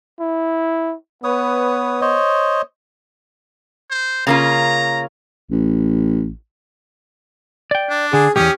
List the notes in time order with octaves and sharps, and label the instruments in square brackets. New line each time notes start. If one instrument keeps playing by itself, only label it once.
[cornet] E4
[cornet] B3 [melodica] B4 C#5 D#6
[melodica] C5 C#5 D#5
[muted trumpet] C5
[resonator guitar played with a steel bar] C#3 A#3 F4 [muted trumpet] A#5
[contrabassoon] A1
[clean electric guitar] D5 G5
[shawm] D4
[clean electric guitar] D3 [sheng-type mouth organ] G#4
[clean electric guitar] B1 E2 [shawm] C#4 [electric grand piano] G4 [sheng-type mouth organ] C#6 D#6